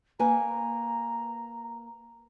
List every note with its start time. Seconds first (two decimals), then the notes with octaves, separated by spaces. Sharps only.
0.19 A#3 B4 G#5 A#5